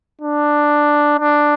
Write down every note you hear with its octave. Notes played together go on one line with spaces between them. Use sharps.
D4
D4